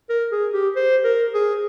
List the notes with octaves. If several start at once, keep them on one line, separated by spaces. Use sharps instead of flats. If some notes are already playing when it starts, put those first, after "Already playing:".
A#4
G#4
G4
C5
A#4
G#4